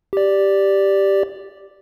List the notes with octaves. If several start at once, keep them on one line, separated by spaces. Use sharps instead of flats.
G4 D5